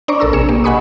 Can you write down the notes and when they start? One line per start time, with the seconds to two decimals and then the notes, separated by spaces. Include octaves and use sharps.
0.08 D4 C5 D5 A#5 C#6 D6
0.20 A#1 A4 A#4 A#5 E6
0.32 A#1 C3 G#4 C#7 E7
0.49 A#3 G4
0.64 D#5 F#5 G#5 B5 C#6 D#6